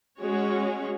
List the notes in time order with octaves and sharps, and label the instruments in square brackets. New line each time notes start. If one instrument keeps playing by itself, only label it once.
[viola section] G#3 C#4 F#4 C#5